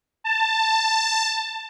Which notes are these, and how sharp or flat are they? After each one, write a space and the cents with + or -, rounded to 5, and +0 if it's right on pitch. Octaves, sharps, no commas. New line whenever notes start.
A5 +15